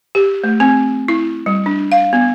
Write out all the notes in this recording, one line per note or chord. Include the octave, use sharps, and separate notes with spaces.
G4
A3
C4
E4
G3
D4
F5
B3